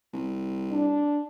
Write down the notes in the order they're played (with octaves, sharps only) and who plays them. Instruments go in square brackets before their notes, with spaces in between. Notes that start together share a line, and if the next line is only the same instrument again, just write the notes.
[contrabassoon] C2
[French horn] D4